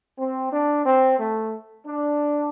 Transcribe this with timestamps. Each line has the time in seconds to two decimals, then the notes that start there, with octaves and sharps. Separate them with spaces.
0.18 C4
0.51 D4
0.85 C4
1.18 A3
1.85 D4